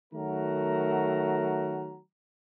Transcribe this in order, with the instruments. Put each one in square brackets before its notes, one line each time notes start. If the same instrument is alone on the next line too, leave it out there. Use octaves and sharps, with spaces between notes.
[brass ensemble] D#3 F#3 A3 F#4 A#4 A#5